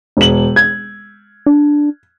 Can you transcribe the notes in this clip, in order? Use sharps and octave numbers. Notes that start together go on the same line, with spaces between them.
E1 F#7
G#6
D4